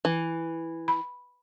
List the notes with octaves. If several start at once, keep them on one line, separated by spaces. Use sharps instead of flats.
E3
B5